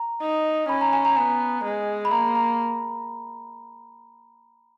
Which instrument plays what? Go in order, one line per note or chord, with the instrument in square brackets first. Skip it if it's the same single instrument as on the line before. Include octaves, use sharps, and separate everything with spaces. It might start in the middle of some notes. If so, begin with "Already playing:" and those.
Already playing: [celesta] A#5
[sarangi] D#4
[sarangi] C#4 [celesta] B5
[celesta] A#5
G#5
A#5
[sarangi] B3 [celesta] G#5
[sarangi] G#3
[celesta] B5
[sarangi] A#3 [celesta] A#5
[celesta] A#5